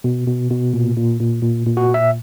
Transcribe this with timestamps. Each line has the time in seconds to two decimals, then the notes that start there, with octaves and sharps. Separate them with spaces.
0.04 B2
0.27 B2
0.51 B2
0.74 A#2
0.97 A#2
1.20 A#2
1.42 A#2
1.66 A#2
1.77 F#4
1.89 A#2
1.94 E5